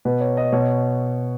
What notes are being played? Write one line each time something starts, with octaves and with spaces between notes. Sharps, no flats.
B2 B4
C#5
D#5
B2 C#5